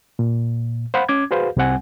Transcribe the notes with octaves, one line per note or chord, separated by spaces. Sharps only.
A#2
C5 F5 F#5 B5
C#4 D6 G#6
F#4 G#4 B4 C5 F5
C2 G3 C4 F#5 G#5